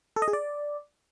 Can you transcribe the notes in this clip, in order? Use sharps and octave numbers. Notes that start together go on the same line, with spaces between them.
A4
D#5
G#4
D5